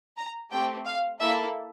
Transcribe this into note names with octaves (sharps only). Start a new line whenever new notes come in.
A#5
A3 C4 G4 G5
F5
A#3 E4 A4 E5